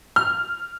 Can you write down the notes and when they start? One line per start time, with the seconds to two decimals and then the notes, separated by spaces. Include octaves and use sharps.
0.16 F6